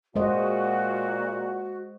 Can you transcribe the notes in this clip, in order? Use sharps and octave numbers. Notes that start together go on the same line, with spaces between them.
A#2 G#3 F#4 C5 D#5